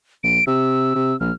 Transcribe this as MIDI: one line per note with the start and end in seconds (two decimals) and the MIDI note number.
0.24 0.39 34
0.24 0.45 98
0.47 0.92 48
0.47 1.17 88
0.95 1.14 48
1.20 1.31 34
1.20 1.34 89